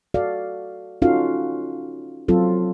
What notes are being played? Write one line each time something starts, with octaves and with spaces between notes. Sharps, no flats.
F#4 A4 D5 F5
C#4 D#4 F4 F#4 A4 F5
F#3 C4 F4 A4